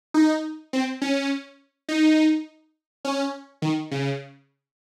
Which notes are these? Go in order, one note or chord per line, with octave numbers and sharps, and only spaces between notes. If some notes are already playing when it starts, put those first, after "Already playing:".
D#4
C4
C#4
D#4
C#4
D#3
C#3